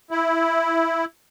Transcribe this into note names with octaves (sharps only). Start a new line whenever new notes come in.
E4